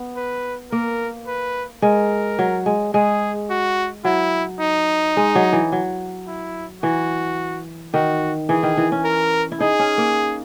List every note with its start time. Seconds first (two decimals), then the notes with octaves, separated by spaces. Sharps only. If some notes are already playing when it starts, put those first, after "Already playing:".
Already playing: B3
0.16 B4
0.71 A#3 A#4
1.27 B4
1.82 G#3 A#4
2.39 F#3
2.66 G#3
2.94 G#3 G#4
3.50 F#4
4.05 F#3 E4
4.60 D#4
5.17 G#3
5.35 F#3
5.53 E3
5.72 F#3
6.27 E4
6.83 E3 F#4
7.94 D#3 F#4
8.49 E3 G#4
8.63 D#3
8.77 E3
8.92 C#4
9.05 A#4
9.52 E4
9.60 D#4 G#4
9.79 C#4
9.98 A#3